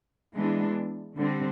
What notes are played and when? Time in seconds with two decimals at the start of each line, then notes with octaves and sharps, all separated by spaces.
0.36 E3 G#3 B3 D4
1.17 D3 G3 C4